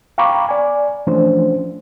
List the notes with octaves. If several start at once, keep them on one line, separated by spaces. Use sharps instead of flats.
F5 G5 A#5 B5 C#6 D6
D5 G#5
E3 F3 A3 C#4 D4 C5